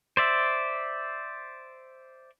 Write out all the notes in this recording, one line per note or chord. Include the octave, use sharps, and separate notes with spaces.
C5 D5 E5